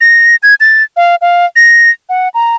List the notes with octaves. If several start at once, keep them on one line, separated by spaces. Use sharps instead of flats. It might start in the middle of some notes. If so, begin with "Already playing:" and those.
A#6
G#6
A6
F5
F5
A#6
F#5
A#5